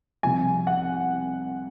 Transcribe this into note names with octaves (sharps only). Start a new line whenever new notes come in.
C2 C3 F3 G#5
F#5